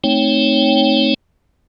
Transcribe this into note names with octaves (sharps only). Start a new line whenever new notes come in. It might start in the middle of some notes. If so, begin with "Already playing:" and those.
A3 C4 D#4 C#5 G5